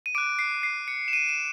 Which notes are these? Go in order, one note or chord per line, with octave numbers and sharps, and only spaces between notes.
D#7
D6 F#6 D7
C7
C7
C#7
E7
D#7
E7